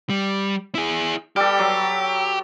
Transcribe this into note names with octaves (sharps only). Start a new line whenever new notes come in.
G3
E4 G#4
G3 G4 A4
F#3